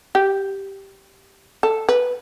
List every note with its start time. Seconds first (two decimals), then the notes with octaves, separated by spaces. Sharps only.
0.15 G4
1.63 A4
1.89 B4